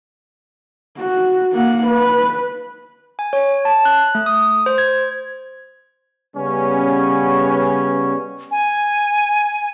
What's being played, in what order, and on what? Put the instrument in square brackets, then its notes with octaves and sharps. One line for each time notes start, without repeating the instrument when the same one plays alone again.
[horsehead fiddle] F#4
A#3 F#5
B4
[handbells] G#5
C#5
A5
F#6
A3
D#6
C5
G#6
[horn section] C#3 G3 B3 C#4
[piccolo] G#5